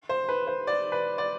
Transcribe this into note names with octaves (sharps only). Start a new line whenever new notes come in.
C5
B4
C5
D5
B4
D5